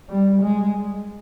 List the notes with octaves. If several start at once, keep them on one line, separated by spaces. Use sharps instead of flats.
G3
G#3